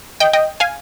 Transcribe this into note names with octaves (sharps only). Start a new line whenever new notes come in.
D#5 G5
D#5 G5
F5 G#5